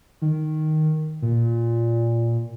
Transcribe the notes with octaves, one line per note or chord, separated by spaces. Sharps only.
D#3
A#2